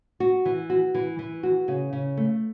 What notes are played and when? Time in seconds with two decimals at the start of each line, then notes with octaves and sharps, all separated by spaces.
0.20 F#4
0.45 E3
0.70 F#4
0.94 E3
1.19 E3
1.43 F#4
1.68 C#3
1.93 C#3
2.17 A3